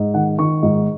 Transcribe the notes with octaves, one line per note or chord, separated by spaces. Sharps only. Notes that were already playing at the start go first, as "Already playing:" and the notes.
Already playing: G#2
D#3 F#5
D#3 C#6
G#2